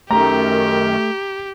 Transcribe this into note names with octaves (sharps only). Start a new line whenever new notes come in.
F#2 D#3 A3 G4 A#5